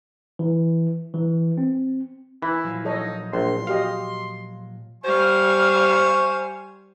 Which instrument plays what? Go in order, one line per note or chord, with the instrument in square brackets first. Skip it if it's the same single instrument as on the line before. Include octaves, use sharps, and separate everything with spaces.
[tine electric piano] E3
E3
C4
[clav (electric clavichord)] E3 [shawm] E4 [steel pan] B5
[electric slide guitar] A#2 F3 F#3
[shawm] D#4 [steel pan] A4 C#5 D#5
[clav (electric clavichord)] A#1 [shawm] C6
[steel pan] F#4 G4 D#5 [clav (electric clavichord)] F5
[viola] G3 F5 [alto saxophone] C5 [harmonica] G#5 C#6